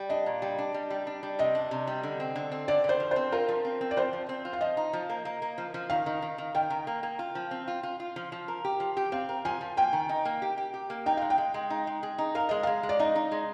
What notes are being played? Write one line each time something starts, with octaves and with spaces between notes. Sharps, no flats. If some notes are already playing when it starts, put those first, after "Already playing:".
Already playing: G3
D4 D#5
A#2
G3
D4
G3
G3
D4
G3
C3 D#5
D4
C3
G3
D3
C4
D3
C4
D3 D5
D3
C5
F3
C4 C5
F4 A#4
F3
C4
C4
D5
F3 C5
F3
C4
F4
F5
F3 D#5
D#4
F3
A#3
A#3
A#3
F3
F3
D#3 F5
D#3
D#3
D#3
D#3 G5
D#3
A#3
A#3
F4
F3
C4
F4
F4
F4
F3
F3
A#4
G4
F3
G4
C4 F5
A#4
F3 G#5
F3
A#3 G5
D#3
D#4
A#3
G4
G4
G4
A#3
D#4 G5
G#3 F5
G5
G#3
G#3
D#4
G#3
G#4
D#4
A#4 F5
G#3 D#5
G#3 F5
G#3
D5
D#4 D#5
D#4
G#3